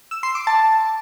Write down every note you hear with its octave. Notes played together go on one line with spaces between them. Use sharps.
E6
C6
D6
A5